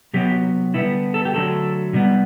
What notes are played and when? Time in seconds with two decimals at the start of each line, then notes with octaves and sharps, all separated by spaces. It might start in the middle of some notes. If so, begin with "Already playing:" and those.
0.13 C3 F#3 B3 G4
0.74 D3 G3 B3 E4
1.14 A4
1.25 G4
1.34 D3 F#3 A3 A4
1.93 C3 G3 B3